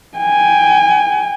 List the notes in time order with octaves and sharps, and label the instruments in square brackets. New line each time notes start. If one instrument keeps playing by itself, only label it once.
[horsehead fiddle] G5 G#5